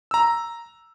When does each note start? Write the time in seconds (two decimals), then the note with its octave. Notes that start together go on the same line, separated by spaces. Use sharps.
0.11 A#5 E6